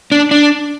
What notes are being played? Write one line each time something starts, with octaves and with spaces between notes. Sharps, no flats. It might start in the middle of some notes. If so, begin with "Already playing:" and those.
D4
D4